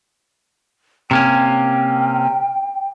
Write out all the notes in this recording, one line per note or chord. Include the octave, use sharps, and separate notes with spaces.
C3 A#3 C#4 G5